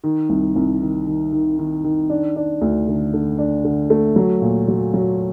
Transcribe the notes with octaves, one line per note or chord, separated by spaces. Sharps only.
D#3
C2
C2
D#3
D#3
D#3
D#3
D#3
D4
D4
D2
D3
D3
D4
D3
A3
F#3
A#2
F#3
F#3